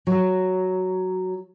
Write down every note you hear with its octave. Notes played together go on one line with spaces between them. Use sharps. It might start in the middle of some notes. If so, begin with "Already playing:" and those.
F#3